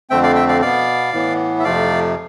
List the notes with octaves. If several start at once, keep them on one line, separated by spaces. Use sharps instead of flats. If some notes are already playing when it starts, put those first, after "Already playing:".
F2 D3 A3 C4 E5 G5
D5 F5
E5 G5
D5 F5
B2 B3 D5 F5
A2 E3 B3
E5
F2 C3 F3 A3 D5 F5